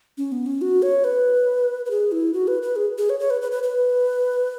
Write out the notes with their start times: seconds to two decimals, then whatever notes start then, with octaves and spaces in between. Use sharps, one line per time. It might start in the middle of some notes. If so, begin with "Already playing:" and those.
0.18 C#4
0.32 B3
0.46 C#4
0.61 F#4
0.82 C#5
1.04 B4
1.86 B4
1.90 G#4
2.12 E4
2.33 F#4
2.48 B4
2.62 B4
2.76 G#4
2.98 G#4
3.09 C#5
3.20 C#5
3.30 B4
3.42 B4
3.52 B4
3.63 B4